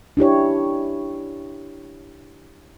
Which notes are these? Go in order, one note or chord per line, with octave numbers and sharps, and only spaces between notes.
D4 E4 G4 C#5